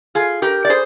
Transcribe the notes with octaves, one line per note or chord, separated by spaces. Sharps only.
F4 G#4
G4 A#4
D5
G#4 C5